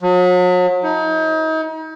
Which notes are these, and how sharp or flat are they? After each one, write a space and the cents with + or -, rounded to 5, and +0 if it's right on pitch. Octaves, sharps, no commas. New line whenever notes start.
F#3 -40
D#4 +35